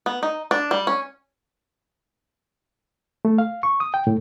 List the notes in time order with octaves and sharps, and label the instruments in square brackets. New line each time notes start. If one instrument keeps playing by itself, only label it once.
[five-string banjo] B3
D#4
D4
G3
C#4
[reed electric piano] A3
F5
C#6
D#6
G5
A2